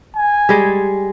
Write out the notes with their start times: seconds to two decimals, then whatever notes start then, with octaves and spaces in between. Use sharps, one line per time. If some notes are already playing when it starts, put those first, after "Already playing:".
0.16 G#5
0.49 G3 G#3